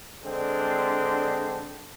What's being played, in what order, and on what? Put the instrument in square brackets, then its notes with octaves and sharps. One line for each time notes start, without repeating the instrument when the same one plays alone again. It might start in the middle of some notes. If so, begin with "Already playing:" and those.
[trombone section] D3 G#3 C4 D4